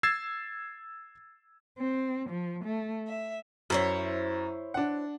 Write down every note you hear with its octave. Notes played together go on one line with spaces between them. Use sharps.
E6 G#6 A6 C7 E7
C4
F3
A3
E5
F#2 E4 C5 C#5
D4 F#5